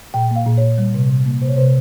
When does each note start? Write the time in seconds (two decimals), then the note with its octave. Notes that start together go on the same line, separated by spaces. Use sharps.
0.14 A#2 G5
0.31 A#3 F5
0.46 A#2
0.58 A#2 C#5
0.78 G3
0.94 C3
1.10 C3
1.26 A#3
1.41 C3 C5
1.49 C#5
1.56 C3 C5